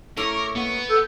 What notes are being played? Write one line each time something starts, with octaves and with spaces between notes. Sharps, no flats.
A3 C#4 E4 A#4 D6
A#3 B3
A4 G6